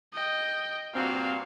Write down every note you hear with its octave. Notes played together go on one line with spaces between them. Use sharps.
D#5 G5
G2 A#2 C4 F#4 F5